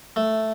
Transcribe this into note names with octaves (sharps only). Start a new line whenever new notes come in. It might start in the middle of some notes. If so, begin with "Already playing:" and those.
A3